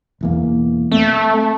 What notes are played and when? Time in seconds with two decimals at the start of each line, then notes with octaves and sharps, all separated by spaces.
0.21 E1 E2 A#3
0.92 A3 C4